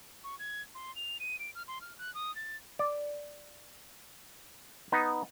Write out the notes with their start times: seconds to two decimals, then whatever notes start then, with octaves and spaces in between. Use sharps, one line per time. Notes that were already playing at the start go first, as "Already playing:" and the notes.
0.24 C#6
0.39 G#6
0.75 C6
0.96 F7
1.20 D#7
1.40 D7
1.55 F6
1.68 C6
1.81 F6
1.98 F#6
2.15 D#6
2.36 A6
2.79 D5
4.92 B3 D#4